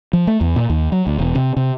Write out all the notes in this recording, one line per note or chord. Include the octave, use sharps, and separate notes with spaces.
F3
A3
E2
A#2
D#2
F#3
D2
E1
C3
C3